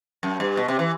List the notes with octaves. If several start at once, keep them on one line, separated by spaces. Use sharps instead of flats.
F#2
G2
B2
C3
E3